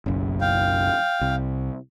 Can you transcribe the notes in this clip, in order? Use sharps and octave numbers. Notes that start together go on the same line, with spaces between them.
F#1 B1 F#2
F5 G5
C2